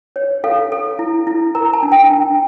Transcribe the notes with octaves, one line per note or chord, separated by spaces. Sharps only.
C#5
A4 F5
A4
E4
E4
A#4 A#5
A5
D4
G5
D4